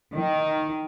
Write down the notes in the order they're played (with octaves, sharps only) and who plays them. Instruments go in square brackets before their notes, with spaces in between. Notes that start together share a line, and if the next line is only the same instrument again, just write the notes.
[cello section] D#3